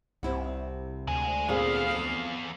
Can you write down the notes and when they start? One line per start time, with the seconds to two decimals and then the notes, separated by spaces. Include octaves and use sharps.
0.23 C2 C3 E4 F#5
1.08 D2 G#3 G#5
1.49 E2 A#2 B3 C4 G#4 F5
1.90 F2